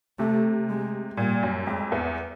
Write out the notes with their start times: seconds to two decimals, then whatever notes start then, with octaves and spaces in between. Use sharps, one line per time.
0.19 C3 A3
0.69 G#3
1.17 A#2 G3
1.43 F#2
1.67 F2 G#3
1.92 E2